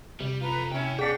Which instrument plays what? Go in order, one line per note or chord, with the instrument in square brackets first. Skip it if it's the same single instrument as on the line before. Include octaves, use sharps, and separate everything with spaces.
[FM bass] C3 [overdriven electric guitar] G3
[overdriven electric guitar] F4 A4 [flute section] B4 A#5
[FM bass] C3 [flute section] C#4 E4 [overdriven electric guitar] C#5 G5
[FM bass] B2 [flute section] C#4 D4 D6 [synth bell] G#4 B6 [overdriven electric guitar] G5